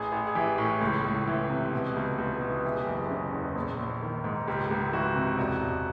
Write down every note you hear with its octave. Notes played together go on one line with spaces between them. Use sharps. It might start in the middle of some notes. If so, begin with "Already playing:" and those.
Already playing: A1 G#4
A1
G#4
E3 G4
A2
C#2
C#2
E3
C3
B2
C#2
C#2
B2
E3 G4
G#4
G4
F#1
C#3
E2
A#1
A#1
D#3
G#2
C#2 G4
C#2
E3 F#4
C3
E1 F#4
E1